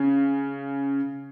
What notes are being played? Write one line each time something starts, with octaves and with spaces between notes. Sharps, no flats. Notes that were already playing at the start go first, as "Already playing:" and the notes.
Already playing: C#3